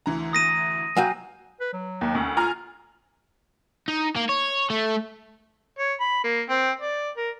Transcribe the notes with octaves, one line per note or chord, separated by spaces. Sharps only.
D2 E3 A#5
D#6 A#6 D#7
F#3 F#4 F5 G5 G#5
B4
F#3
D#2
D2 C#4
F4 G#5 A#5 F6
D#4
A#3
C#5
A3
C#5
B5
A#3
C4
D5
A#4